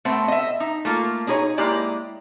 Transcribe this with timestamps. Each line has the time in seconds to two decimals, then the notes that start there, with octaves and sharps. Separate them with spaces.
0.05 A3 B3 C4
0.28 D#5 E5
0.60 D#4
0.85 A3 A#3 F4
1.27 D4 D#4 G#4 A#4 C#5 D#5
1.58 G#3 A#3 E4 G4 D5 D#5